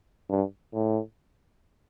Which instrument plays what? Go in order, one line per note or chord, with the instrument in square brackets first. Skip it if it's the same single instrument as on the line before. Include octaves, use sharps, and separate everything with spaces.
[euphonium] G2
A2